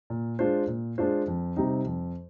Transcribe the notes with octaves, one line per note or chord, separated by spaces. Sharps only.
A#2
G#3 D4 F4 C5
A#2
G#3 D4 F4 C5
F2
C3 G3 C4 D#4
F2